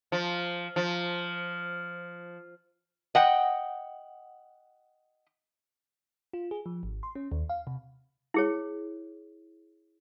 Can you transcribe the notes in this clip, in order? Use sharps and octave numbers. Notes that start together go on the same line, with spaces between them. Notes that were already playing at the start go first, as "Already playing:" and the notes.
F3
F3
D#5 F#5 G5
F4
G#4
F3
G#1
C6
C#4
D#2
F5
C3
E4 G#4 C#5